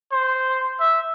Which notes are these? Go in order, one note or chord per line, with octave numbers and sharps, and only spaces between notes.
C5
E5